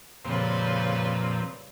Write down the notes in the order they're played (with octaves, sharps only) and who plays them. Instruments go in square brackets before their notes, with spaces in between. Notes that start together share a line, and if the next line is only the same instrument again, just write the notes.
[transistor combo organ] F2 A#2 C4 [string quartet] C#3 G3 B4